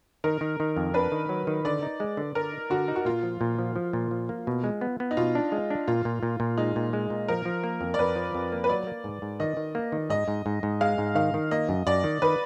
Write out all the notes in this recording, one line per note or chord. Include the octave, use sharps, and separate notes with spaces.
D#3 A#4
D#3
D#3
F2
D4 B4
D#3
F#3
D#3
D3 D5
D#4
G#3
D3
D3 A#4
D#4
D3 F#4
D#4
F#4
A#2 F4
F3
A#2
F3
F3
A#2
F3
A#3
B2
G#3
B3
B3
D#4
B2 F4
D4
G#3
D4
A#2 F4
A#2
A#2
A#2
G#3 D#4
A#2
G#3
A#2
F3 A#4
F3
A#3
F2
D5
F2 B4
F3
F2
A#3
B4
F#3 D5
A#3
G#2
G#2
D#3 D#5
D#3
A#3
D#3
G#2 D#5
G#2
G#2
G#2
G#3 F5
G#2
D#3 F5
D#3
A#3 D#5
F#2
F#2 D5
D#3
D#3 B4